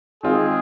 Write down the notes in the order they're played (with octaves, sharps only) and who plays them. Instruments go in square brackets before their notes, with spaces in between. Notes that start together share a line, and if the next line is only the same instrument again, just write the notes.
[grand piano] D#3 G#3 C4 F4 [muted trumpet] G#4